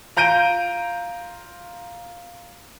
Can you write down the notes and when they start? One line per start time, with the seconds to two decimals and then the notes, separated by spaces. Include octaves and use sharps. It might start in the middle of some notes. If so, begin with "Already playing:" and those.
0.17 F4 A#5 G6 D7 D#7